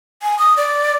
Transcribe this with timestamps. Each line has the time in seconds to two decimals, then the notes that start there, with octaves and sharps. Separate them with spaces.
0.22 G#5
0.39 D#6
0.57 D5